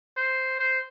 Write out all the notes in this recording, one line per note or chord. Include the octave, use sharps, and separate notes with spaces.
C5
C5